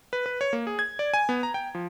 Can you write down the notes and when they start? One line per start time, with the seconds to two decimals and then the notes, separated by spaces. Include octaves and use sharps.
0.13 B4
0.26 B4
0.41 C#5
0.53 A#3
0.67 G#4
0.79 G#6
0.99 D5
1.14 G#5
1.29 B3
1.43 A#5
1.54 G5
1.75 F3